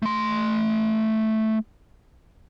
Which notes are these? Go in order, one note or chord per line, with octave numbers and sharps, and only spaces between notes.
A3 C6